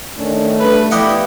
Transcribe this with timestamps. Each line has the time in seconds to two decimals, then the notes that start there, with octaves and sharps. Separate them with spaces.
0.19 D#3 A3 C#4 D4
0.60 G3 D4 A4 B4
0.91 B3 E4 G4 D5 D#5 F5 F#5